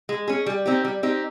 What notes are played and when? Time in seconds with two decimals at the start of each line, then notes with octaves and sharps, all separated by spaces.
0.09 G#3
0.28 C#4 G#4
0.46 G3
0.66 C4 D#4 G4
0.85 G3
1.03 C4 D#4 G4